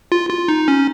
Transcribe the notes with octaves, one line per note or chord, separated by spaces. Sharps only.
F4
F4
D#4
C#4